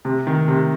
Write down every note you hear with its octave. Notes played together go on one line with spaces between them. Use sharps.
C3
D#3
C3